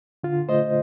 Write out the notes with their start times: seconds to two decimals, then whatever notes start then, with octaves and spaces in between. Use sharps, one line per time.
0.24 D3 F4
0.49 A3 C5 D#5